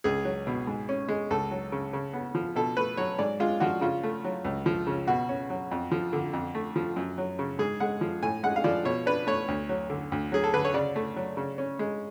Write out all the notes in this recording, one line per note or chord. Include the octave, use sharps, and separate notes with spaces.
C#2 G#4
F#3
B2
G#2
C#4
G#3
C#2 A4
F#3
C#3
C#3
B3
F3
B2 A4
A3 B4
F#3 C#5
G#2 D5
G#3 F4
F3 F#4
C#3 F4
A3
F#3
C#2
F3
C#3
B2 F#4
C#4
F#3
F2
F3
D3
F2
A3
F3
F#2
F#3
C#3
G#2 G#4
G#3 F#5
F3
A2 G#5
G#3 F#5
F5
F3 D5
B2 C#5
D4 B4
A3 C#5
D2
F#3
D3
D2
F#3 G#4
A4
D3 B4
C#5
C#3 D5
A3
F#3
C#3
C#4
G#3